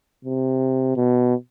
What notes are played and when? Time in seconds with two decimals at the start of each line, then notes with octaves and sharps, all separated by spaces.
0.25 C3
0.96 B2